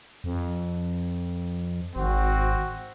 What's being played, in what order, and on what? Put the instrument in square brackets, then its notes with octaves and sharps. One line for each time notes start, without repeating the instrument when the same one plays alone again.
[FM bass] F2
[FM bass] G#1 [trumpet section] C4 F#4